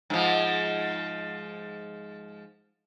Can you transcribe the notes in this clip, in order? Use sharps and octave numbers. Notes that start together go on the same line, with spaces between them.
G#2 F3